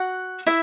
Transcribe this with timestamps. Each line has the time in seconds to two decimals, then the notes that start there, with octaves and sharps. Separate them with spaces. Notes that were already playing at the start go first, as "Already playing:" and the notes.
Already playing: F#4 F#5
0.46 E4 E5